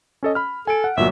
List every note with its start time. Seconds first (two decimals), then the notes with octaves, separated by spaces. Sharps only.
0.23 C#4 A4 D#5
0.35 B5 F6
0.67 A4 G#5 D7
0.84 F#5
0.97 G1 A#2 F#3 E5